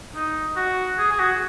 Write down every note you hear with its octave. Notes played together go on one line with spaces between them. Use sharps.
D#4
F#4
G#4
G#4
F#4